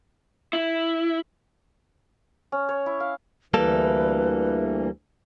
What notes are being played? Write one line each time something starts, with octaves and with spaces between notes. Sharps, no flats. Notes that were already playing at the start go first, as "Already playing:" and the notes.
E4
C#4
C#5
E4
F5
D2 E3 G3 A#3 A4 B4